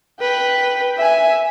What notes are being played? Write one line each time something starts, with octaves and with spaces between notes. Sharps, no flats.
B4 G5
E5 G#5